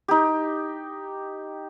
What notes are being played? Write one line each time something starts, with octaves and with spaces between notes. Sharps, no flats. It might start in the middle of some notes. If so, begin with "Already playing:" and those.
D#4 G4